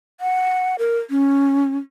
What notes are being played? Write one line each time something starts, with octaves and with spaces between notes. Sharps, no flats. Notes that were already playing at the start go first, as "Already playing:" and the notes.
F#5
A#4
C#4